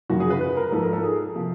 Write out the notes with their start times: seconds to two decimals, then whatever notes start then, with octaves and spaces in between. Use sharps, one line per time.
0.09 F#2 C#3 F3 F#4
0.20 G#4
0.30 B4
0.41 B4
0.57 A#4
0.72 G#2 F3 A4
0.83 A#4
0.93 A4
1.03 G#4
1.35 C3 F3